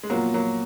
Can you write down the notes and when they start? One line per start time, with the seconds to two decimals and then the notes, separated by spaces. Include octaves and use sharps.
0.03 G#3
0.10 A#2 F3 F#3 A#3 B3 F4
0.34 F#3 A#3